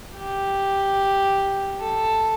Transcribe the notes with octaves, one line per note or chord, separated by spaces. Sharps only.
G4
A4